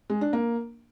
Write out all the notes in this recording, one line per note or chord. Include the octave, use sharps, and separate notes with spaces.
G#3
D4
A#3